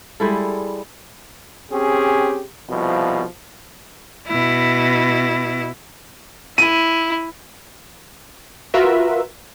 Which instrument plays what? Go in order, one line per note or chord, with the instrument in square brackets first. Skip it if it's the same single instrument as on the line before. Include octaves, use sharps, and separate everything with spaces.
[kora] G3 G#3 E4 A4
[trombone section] C4 C#4 G4 G#4
C2 B2 F3
[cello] B2 E4
[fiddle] E4 [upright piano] D#7
[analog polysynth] F4 F#4 A#4 B4 E5